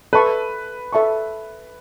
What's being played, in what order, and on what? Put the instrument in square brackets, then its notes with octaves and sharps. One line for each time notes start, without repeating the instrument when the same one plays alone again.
[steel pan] A4 E5 A5 C#6 [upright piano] B4
[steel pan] A4 E5 A5 C#6